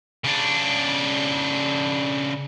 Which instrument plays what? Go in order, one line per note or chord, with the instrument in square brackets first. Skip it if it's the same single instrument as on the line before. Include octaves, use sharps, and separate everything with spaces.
[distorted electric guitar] C#3 D4